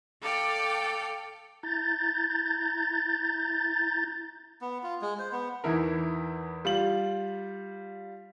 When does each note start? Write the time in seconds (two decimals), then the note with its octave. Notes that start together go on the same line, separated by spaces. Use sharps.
0.23 A4 D5 F5 G5
1.63 E4 A#5 G6 A6
4.61 B3
4.83 F4
5.01 G#3
5.19 C5
5.32 B3
5.64 E2 E3 D#4 E4 A#4
6.65 G3 F4 F#7